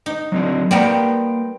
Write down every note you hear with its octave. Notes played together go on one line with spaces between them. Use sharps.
D#4
F#3 C4 D4
G3 A#3 B3 A#4 C5 G5